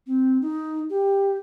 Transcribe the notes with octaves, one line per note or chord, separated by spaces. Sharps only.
C4
D#4
G4